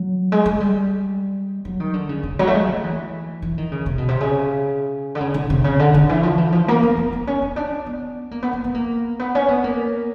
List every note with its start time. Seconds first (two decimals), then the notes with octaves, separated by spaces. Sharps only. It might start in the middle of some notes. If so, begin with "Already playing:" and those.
Already playing: F#3
0.32 G#3
0.46 G#3
0.60 G3
1.65 F#3
1.80 D#3
1.94 D3
2.09 C#3
2.23 C#3
2.39 F#3
2.47 A3
2.54 G#3
2.68 A3
2.84 E3
3.42 E3
3.58 D#3
3.72 C#3
3.86 C3
3.98 B2
4.08 C3
4.20 C#3
5.15 D3
5.20 C#3
5.34 D3
5.50 C3
5.64 C#3
5.79 D3
5.94 D3
6.09 E3
6.23 F3
6.38 E3
6.53 F3
6.68 A#3
6.83 B3
6.97 B3
7.13 C4
7.27 C#4
7.42 C#4
7.56 D4
7.86 B3
8.31 A#3
8.42 B3
8.53 B3
8.64 B3
8.75 A#3
9.19 B3
9.35 C#4
9.49 B3
9.64 A#3